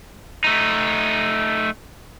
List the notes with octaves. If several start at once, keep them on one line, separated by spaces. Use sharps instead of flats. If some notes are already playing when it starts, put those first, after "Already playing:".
A3 D#4